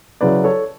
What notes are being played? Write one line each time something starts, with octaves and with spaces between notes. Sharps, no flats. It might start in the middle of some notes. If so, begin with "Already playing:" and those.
C#3 F#3 C#4 E4 B4 D5
A4 C#5